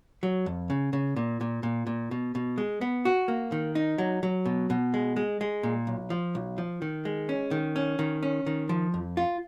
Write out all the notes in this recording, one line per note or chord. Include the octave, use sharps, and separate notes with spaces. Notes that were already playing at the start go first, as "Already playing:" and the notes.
F#3
F2
C#3
C#3
A#2
A#2
A#2
A#2
B2
B2
G#3
B3
F#4
A#3
D#3
D#4
F#3
F#3
B2
B2
G#3
G#3
G#3
A#2
B1
F3
B1
F3
D#3
G#3
C#4
D#3
C#4
D#3
C#4
D#3
F3
F2
F4